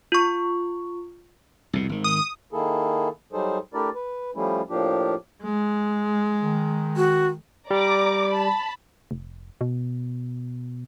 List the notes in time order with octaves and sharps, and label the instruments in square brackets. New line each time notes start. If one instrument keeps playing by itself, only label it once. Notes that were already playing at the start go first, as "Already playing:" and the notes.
[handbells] F4 C#6
[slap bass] C2 F2 B2
G#1 D#3
[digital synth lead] D#6
[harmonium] D#3 A#3 E4 G#4 A4
F#3 G3 D#4 G#4 A4 C5
A3 D4 E4 G4 A#4 D5
B4
F3 G3 A3 C#4 E4
A2 F3 A#3 D4 F4 G4
[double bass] G#3
[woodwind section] D#3
[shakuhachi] F#4
[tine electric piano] G3 [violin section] D5 A#5 D6
[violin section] A5 B5
[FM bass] F1
B2